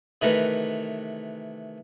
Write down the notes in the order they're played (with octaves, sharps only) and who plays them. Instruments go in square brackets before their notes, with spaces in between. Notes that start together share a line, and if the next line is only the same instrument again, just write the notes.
[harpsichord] C3 D#3 E3 A3 A#4 B4